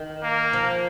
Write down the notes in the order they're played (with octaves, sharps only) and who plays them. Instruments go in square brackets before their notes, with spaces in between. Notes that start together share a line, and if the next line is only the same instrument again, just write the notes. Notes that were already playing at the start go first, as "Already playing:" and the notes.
Already playing: [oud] D#3
[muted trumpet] A#3
[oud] F3